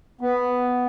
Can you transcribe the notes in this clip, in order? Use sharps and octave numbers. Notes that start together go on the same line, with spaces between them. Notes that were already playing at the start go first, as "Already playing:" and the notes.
B3